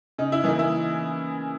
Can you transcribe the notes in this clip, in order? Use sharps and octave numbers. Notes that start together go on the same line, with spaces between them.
C#3 D#4
E4
E3 A#3 D#4
E4